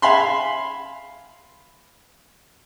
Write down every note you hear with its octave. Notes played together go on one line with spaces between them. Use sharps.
E5 F5 G#5 B5 C6